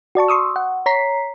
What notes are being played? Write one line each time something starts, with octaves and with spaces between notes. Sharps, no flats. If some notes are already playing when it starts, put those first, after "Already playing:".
F#4 D5 A5 C#6
C6 C#6 D#6 E6
F#5
C#5 A#5 B6 C7